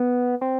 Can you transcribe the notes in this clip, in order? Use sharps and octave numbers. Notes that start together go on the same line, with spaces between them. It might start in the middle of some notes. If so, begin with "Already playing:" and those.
Already playing: B3
C4